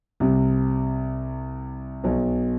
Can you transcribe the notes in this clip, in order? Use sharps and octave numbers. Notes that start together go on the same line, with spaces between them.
C2 C3
B1 B2